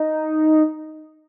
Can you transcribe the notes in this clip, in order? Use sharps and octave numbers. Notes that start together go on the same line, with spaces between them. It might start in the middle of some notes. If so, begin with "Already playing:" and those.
Already playing: D#4